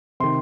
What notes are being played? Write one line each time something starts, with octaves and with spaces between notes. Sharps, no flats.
C3 D#3 C6